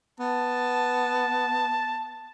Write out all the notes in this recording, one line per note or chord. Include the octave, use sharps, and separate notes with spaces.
B3 A5